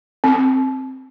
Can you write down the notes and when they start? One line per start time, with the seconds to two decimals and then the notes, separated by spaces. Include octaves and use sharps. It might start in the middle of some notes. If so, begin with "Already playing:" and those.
0.24 C4